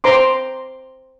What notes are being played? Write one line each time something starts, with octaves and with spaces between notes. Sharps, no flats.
C5 A#5 C6 D6